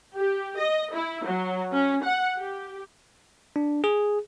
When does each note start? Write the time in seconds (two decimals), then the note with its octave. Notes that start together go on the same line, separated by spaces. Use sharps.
0.15 G4
0.59 D#5
0.95 E4
1.25 F#3
1.73 C#4
2.04 F#5
2.37 G4
3.56 D4
3.84 G#4